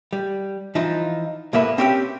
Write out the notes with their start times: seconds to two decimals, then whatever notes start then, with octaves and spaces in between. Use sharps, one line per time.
0.13 G3
0.75 E3 F3 D#4 F4
1.53 C2 A2 A#3 B3 E5 B5
1.78 C4 C#4 G4 B4 E5 G5